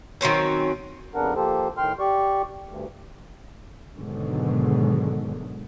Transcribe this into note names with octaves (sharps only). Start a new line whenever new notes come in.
D#3 F#3 C4 C#4
F2 C#3 B3 D4 A#4 F#5
F3 A#3 G4 A4 C5
A2 D#3 G5 C6 F6
G4 D5 C#6
D2 G2
G#2 B2 D3 D#3 F#3 G#3